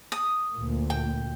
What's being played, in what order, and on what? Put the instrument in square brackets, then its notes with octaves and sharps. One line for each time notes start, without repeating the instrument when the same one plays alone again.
[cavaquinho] D#6
[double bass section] D2 A#2
[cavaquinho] G5